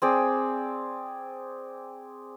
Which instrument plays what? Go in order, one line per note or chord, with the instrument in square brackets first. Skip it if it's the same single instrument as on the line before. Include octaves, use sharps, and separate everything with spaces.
[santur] C4 G#4 D5